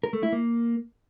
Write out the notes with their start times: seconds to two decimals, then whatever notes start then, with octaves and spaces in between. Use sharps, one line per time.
0.03 A#4
0.13 A3
0.23 E4
0.32 A#3